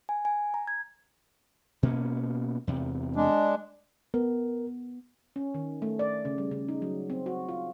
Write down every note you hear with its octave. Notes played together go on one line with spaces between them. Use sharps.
G#5
G#5
A#5
G#6
B2 A#3 C#4
E2 C3
G#3 D4
B3 A#4
C#4
D#3
A3
D5
C#3
G3
C#3
D#4
F#3
C4
F#4
F4